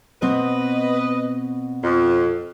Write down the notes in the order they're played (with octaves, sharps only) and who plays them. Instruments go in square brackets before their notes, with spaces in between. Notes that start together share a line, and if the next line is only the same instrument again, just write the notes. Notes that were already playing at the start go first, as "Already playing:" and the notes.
[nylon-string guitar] B2 C4 [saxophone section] B4 D#5
[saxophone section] F2